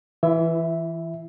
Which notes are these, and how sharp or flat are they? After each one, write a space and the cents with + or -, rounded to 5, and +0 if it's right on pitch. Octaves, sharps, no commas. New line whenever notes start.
E3 +0 E4 +40 E5 -5